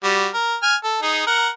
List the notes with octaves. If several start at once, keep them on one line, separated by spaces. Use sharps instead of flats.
G3 F#4
A#4
G#5 F6
A4
D#4 G#4
A#4 F#5